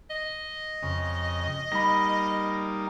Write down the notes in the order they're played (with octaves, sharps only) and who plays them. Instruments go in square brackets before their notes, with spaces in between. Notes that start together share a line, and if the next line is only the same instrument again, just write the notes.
[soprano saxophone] D#5
[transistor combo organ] F2 C#3
[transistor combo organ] G3 A#3 D#4 [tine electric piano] B5 A#6